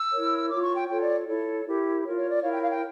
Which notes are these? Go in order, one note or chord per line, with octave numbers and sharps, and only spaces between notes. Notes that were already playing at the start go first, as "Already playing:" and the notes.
Already playing: E6
E4 A#4 C#5
F4 C#5 D6
C#6
G5
F4 A4 C#5 G5
D5
E4 A4 C#5
E4 G4 A#4
F4 A#4 C#5
C#5
D5
E4 A#4 C#5 F5
G5
F5
G5